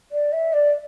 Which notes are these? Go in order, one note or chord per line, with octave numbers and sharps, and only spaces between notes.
D5
E5
D5